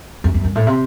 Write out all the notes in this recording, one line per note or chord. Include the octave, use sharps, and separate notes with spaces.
F#2
F#2
G2
A2
C3